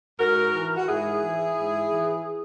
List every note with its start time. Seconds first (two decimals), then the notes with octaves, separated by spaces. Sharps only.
0.19 G#2 F#4 A#4
0.54 E3
0.77 F#4
0.88 G#2 E4 G#4
1.23 E3
1.57 G#2
1.91 E3